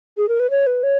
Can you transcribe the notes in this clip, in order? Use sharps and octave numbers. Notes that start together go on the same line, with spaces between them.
G#4
A#4
B4
C#5
B4
C#5